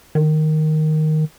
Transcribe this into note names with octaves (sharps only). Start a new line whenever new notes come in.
D#3